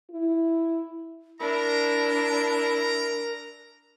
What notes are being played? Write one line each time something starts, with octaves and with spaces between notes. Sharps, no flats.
E4
D4 E4 A#4 A#5